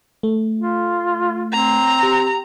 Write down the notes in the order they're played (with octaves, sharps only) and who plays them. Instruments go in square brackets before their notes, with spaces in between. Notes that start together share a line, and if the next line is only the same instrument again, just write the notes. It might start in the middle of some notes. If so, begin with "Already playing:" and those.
[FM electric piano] A3
[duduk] F4
[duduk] C4 [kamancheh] A#5
[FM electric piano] G4